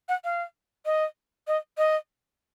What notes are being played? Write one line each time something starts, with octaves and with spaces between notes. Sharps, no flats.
F#5
F5
D#5
D#5
D#5